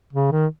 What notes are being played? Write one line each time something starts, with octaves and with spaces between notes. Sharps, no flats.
C#3
D#3